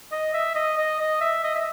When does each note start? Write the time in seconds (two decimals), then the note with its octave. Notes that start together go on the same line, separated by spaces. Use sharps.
0.12 D#5
0.34 E5
0.56 D#5
0.78 D#5
1.00 D#5
1.21 E5
1.44 D#5
1.56 E5